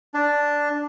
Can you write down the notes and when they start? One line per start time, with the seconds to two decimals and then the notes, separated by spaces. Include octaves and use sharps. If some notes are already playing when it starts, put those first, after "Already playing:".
0.14 D4